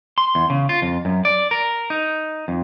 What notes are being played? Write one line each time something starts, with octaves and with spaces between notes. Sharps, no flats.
C6
E2
C#3
F4
F2
F#2
D5
A#4
D#4
F2